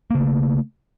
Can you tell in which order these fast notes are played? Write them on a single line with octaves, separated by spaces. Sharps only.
A#3 C#3 A3